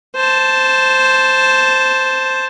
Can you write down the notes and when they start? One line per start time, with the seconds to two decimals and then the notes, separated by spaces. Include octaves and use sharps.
0.15 C5 A5